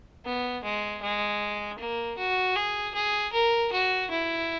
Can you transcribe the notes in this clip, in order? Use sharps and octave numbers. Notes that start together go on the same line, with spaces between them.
B3
G#3
G#3
A#3
F#4
G#4
G#4
A#4
F#4
E4